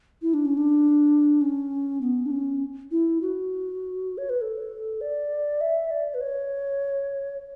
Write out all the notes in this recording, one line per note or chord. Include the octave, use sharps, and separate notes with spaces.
E4
D4
C#4
D4
C#4
B3
D4
C#4
E4
F#4
C#5
B4
A4
D5
E5
D5
B4
C#5